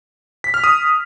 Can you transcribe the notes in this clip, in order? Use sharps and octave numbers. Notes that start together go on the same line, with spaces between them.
B6
F6
D#6